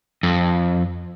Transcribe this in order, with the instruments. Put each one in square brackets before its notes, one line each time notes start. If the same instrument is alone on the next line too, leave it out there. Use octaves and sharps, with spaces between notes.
[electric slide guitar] F2